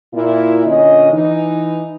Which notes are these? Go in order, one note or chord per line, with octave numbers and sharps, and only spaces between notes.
A#2 E4
A#2 D3 C#4 D#5
E3 D#4